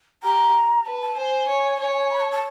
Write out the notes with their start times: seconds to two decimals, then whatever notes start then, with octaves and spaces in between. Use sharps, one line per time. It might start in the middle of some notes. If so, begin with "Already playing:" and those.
0.23 G4 A#5
0.86 B4 A5
1.01 A5
1.17 C5 G#5
1.48 C#5
1.80 C#5
2.10 B5
2.21 A5
2.32 A5